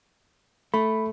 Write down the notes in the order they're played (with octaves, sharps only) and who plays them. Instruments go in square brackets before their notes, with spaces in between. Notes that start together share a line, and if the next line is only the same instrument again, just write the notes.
[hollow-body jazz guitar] A3 [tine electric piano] B5